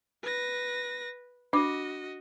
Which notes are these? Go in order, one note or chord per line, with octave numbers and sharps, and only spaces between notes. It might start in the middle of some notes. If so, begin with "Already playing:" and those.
B4 A#6
D4 F#4 D#5 D6